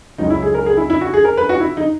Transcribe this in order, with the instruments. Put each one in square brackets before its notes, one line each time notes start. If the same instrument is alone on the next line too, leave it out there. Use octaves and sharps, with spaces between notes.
[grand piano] C#2 C#3 F#3 D#4
E4
G#4
A#4
G#4
E4
E4
F#4
G#4
A#4
B4
F#4
E4
D#4